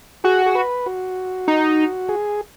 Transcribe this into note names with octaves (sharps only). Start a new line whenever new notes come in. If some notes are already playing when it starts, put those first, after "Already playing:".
F#4 G#4
G#4
B4
F#4
D#4
G#4